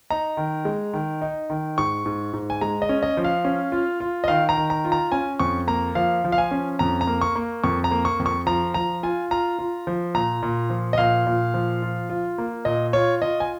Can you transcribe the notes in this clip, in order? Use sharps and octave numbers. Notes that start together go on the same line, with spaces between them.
D#4 A#5
D#3
G#3
D#3
D#4
D#3
G#2 C#6
G#2
G#2
G#5
G#3 A#5
D#5
C#4
D#5
F3
F5
C#4
F4
F4
D#5
D#3 F5
A#5
D#3
A#5
F4
A#5
C#4 G#5
F2 C#6
A#3 A#5
F3 F5
F3
F5
G#5
C#4
F2 A#5
A#5
A#3
C#6
A#3
F2 C#6
A#5
A#3
C#6
F2
C#6
F3 A#5
F3 A#5
F4 G#5
F4 A#5
F4
F3
A#2 A#5
A#2
F3
D#5
A#2 F5
A#2
F3
F4
F4
A#3
A#2 D#5
F4 C#5
F4 D#5
G#5